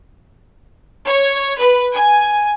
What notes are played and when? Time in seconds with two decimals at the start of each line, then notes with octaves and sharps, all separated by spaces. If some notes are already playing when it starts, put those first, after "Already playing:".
1.06 C#5
1.58 B4
1.93 G#5